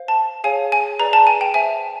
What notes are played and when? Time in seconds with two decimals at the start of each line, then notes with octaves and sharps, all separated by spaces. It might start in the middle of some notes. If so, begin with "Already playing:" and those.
Already playing: C5 F5
0.08 A5
0.44 G#4 C#5 F5 G#5
0.72 G#5
0.99 G#4 B4 D5 A#5
1.13 A5
1.27 G#5
1.41 G5
1.54 C5 E5 G5 G#5